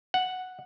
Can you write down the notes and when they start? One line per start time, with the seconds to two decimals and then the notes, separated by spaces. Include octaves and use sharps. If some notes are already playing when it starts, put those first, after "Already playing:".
0.14 F#5